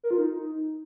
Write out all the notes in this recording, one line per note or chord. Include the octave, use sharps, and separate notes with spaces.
A#4
F4
D#4